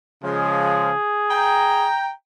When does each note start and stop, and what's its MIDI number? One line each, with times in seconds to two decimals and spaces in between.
0.24 0.92 49
0.24 0.92 53
0.24 0.92 56
0.24 1.89 68
1.31 2.11 79
1.31 2.11 82